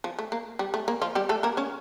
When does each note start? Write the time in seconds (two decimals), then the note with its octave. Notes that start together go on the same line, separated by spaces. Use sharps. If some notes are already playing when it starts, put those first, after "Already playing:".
0.04 F3
0.19 A3
0.32 A#3
0.59 G3
0.74 A3
0.88 A#3
1.02 F3 F4
1.15 G3 G4
1.29 A3 A4
1.43 A#3 A#4
1.57 C#4 C#5